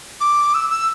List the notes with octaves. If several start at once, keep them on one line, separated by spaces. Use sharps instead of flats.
D6
E6
E6